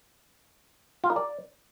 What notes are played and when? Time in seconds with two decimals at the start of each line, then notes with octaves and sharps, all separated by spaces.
1.04 F4
1.10 A#4
1.16 D5